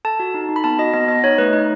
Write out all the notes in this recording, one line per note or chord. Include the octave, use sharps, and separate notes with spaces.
A4 A5
F#4
D#4
D#4
B5
B3 A5
F#4 D#5
B3 D#5
B3 D#5
D#4 C#5
A3 B4
D#4 B4